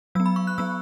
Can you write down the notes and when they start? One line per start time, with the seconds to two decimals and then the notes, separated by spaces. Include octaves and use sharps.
0.15 F#3 E6
0.20 B3
0.26 B5
0.36 C#6
0.47 F#6
0.58 F#3 B3 E6